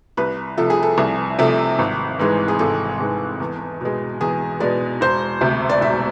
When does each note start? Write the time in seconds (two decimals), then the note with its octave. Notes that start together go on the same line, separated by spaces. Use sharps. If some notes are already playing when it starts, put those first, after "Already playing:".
0.17 C2 B4
0.57 C3 F3 A3 A4
0.70 G#4
0.83 A4
0.98 C2
1.39 C3 F3 A3
1.79 G#1
2.19 G#2 E3 G#3
2.48 G#4
2.59 G#1 A4
3.00 G#2 E3 G#3
3.40 E2
3.81 B2 G#3
4.21 E2 G#4
4.60 B2 G#3 D5
5.01 E1 C5
5.41 D2 C3
5.69 D5
5.81 E1 E5